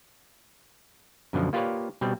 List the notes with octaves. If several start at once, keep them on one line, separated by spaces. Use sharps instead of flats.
F#2 B2 D3 F3
A#3 F4 G4 B4 C#5 D5
B2 G3 C4